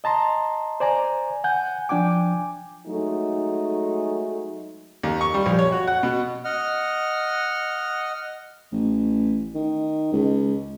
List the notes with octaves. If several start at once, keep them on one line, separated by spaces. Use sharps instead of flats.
D#5 A5 A#5 C6
C5 D5 G#5 A#5
F#5 G#5 G6
F3 D4 G5 G#5 D6
F#3 G#3 A3 D#4
D#2
C#6
G3
A#1
C#5
F#4
F#5
B2
D#5 F#5 F6
A1
D#3
C#2